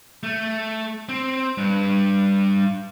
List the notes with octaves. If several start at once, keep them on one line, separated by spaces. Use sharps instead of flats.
A3
C4
G2